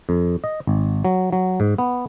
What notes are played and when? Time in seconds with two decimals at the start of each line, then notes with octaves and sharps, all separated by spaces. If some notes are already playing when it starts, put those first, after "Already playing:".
0.09 F2
0.44 D#5
0.67 G#1
1.05 F#3
1.33 F#3
1.60 G#2
1.78 B3